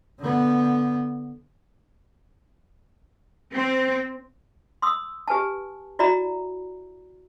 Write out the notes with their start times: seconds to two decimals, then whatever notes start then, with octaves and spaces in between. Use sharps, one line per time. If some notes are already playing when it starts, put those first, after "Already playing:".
0.19 D3 B3
3.53 C4
4.82 C6 D#6 E6
5.28 G4 B4 G#5 A5
5.99 E4 F#4 D5 E5 A#5 B5